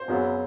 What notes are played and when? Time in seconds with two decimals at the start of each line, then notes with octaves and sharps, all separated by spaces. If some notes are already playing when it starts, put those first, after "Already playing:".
Already playing: C5
0.08 F#2 C#3 F#3 B3